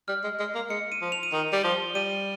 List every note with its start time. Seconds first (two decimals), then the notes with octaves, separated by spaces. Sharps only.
0.08 G3 F6
0.24 G#3
0.40 G#3
0.55 A#3
0.70 G#3 C#7
0.92 D#7
1.02 F3
1.12 F7
1.23 D#7
1.32 D#3 F7
1.53 G3 F7
1.64 F3 G7
1.95 G3 D#7